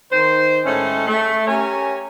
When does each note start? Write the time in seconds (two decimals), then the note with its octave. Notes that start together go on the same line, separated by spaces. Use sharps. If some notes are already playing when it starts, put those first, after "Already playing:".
0.12 D#3 C5
0.65 A2 G#3 A3 C#4
1.08 A3
1.47 C#4 G4 A#4 C#5 G#5